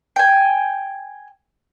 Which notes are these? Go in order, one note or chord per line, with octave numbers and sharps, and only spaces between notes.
G5 G#5